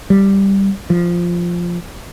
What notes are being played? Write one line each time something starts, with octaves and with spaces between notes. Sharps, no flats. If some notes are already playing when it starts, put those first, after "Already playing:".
G3
F3